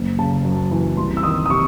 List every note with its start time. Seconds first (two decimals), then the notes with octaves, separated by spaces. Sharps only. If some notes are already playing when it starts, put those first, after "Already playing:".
Already playing: F#1
0.19 C#3 A5
0.45 F#2
0.71 E3
0.97 C2 C6
1.17 E6
1.23 D#3 D#6
1.46 D#6
1.50 C3 C#6